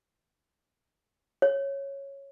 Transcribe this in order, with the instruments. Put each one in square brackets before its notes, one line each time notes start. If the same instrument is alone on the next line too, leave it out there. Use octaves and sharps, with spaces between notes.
[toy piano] C#5